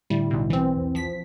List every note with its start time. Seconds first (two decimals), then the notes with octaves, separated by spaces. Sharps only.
0.10 A2 D3 G3 E4
0.31 B1 B2
0.50 E3 C4
0.77 E2
0.95 F3 B6